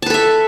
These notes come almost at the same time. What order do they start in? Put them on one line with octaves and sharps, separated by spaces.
A5 B4 A4 E5